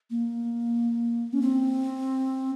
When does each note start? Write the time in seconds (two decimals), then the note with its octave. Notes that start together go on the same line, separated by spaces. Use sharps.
0.10 A#3
1.33 C#4
1.42 C4